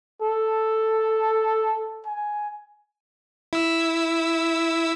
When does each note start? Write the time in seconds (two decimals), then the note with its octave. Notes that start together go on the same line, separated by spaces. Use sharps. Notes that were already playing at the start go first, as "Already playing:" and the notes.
0.22 A4
2.06 G#5
3.53 E4 E6